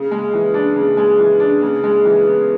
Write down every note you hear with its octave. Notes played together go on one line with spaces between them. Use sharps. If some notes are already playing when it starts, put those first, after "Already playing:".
Already playing: C#3
G#3
E3
D4
C#3
G#3
E3
D4
C#3
G#3
E3
B3